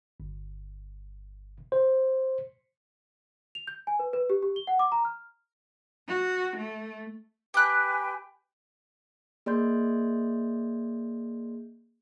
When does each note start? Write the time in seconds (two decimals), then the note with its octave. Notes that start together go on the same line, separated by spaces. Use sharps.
0.20 G1
1.72 C5
3.55 F7
3.67 G6
3.87 G#5
3.99 B4
4.13 B4
4.30 G4
4.43 G4
4.56 G7
4.67 F#5
4.79 D6
4.92 A#5
5.05 F6
6.08 F#4
6.57 A3
7.54 G4 B4 G5 G#5 F#6
9.46 A#3 G#4 D5 D#5 C6 G6